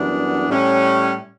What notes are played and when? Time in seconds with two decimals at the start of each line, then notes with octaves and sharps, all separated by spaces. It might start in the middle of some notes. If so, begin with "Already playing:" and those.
Already playing: F#2 E3 G3 B3 D4
0.49 A2 G3 C#4